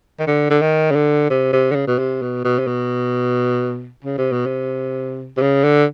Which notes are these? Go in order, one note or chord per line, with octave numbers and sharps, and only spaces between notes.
D#3
D3
D3
D#3
C#3
D3
C3
C3
D3
C#3
B2
C3
B2
B2
C3
B2
C#3
C3
B2
C3
C3
C#3
D3